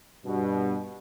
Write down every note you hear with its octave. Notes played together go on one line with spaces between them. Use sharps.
G2 B2